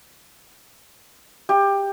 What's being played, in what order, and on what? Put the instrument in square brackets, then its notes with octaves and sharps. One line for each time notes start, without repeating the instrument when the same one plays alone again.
[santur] G4